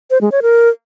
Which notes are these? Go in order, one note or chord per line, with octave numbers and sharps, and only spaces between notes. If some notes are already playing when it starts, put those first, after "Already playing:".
C5
G#3
C#5
A#4